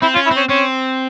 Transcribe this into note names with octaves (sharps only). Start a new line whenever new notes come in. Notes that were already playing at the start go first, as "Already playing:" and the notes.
C4 E4
C#4 F4
E4
C4
C#4
C4 C#4